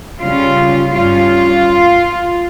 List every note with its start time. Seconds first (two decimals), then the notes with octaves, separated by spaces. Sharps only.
0.23 C#3 G3 C#4 F4
0.94 G2 G3 C#4 F4